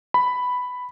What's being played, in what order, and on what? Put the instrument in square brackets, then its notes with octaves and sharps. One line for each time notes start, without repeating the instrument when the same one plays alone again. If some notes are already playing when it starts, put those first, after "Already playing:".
[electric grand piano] B5